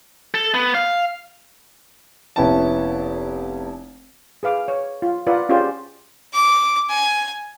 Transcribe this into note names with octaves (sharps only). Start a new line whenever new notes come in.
A4
B3
F5
F1 B3 C#4 E4 G5 A5
G#4 B4 F5 D6
C#5
F4
F4 A#4 B4 D5 F#5
C#4 F4 G4 G#4 C5 D5
D6
G#5